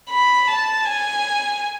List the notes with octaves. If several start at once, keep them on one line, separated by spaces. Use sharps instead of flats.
B5
A5
G#5